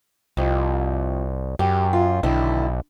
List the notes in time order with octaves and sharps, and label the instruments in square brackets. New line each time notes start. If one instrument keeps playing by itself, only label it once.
[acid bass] C2 [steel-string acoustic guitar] F2
[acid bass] F#2 [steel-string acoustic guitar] G4
[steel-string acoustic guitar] F4
[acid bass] B1 [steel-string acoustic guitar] D3 D#3 E4